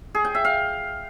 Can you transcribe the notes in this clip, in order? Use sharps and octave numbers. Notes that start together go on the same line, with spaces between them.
G#4
G5
E5
F5